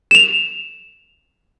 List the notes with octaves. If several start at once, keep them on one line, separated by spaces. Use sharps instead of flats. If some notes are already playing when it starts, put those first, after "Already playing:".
E7 F7